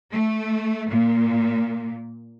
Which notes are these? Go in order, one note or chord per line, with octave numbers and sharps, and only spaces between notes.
A3
A#2